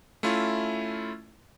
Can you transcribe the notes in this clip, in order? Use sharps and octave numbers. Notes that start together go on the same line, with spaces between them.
A3 C#4 E4 F4